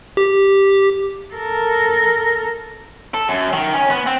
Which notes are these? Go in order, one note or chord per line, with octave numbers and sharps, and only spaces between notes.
G4
A4 A#4
A4
F#2
D#3
C#4
B3
C4